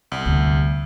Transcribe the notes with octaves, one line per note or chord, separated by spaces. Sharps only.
C2
D2